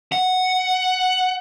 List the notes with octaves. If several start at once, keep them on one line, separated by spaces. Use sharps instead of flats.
F#5